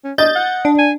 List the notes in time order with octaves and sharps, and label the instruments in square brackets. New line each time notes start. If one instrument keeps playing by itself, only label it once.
[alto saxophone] C#4
[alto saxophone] D4 [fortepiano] D#5 [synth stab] G6 A6
[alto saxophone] F#5
[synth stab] D4
[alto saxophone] G#5